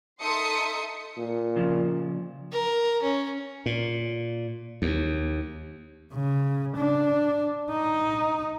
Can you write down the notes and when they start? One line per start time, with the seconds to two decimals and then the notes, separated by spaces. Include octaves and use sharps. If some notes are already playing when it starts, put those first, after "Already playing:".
0.22 D#4 A4 E5 C6 D#6 C#7
1.17 A#2
1.56 C#3 F3
2.52 A#4
3.02 C#4
3.66 A#2
4.82 D#2
6.14 C#3
6.77 D4
7.72 D#4